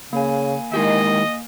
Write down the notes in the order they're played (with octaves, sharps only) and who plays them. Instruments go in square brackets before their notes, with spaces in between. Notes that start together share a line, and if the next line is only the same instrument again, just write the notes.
[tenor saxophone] C#3 [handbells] A#3 G#5
[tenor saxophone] D#3 [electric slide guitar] G#3 E4 G4 [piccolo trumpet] D#5